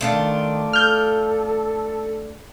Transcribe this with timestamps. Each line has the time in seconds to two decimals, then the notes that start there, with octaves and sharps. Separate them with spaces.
0.01 D#3 A3 D4 F4
0.73 A4 F6 G6